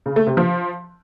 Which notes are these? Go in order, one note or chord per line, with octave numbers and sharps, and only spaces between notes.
C#3
A3
C3
F3